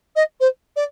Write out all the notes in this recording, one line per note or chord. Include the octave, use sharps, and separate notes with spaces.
D#5
C5
D5